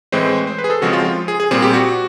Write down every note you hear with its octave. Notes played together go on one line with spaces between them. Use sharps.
A2 E3 G#3 C4 C5
C5
B4
G#4
A4
C#3 F3 G#3 C4 F#4
F4
F4
G#4
G#4
A#2 G3 C4 G#4
G4
F#4